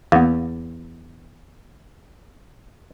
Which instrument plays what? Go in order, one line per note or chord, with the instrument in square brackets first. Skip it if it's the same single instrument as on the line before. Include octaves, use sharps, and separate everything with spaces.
[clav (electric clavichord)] E2 [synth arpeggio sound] A#3 B3